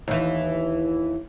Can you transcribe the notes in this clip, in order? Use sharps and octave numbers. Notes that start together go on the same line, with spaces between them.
D#2 E3